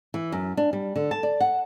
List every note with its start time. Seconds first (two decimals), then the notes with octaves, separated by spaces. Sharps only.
0.14 E3
0.32 F#2
0.57 D4
0.73 G3
0.96 D3
1.11 A5
1.23 D5
1.40 F#5